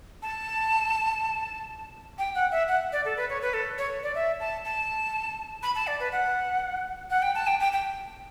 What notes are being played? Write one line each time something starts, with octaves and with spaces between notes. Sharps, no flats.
A5
G5
F#5
E5
F#5
D5
A4
B4
C#5
B4
A4
C#5
D5
E5
A5
A5
B5
A5
D5
B4
F#5
F#5
G5
A5
G5
G5
G5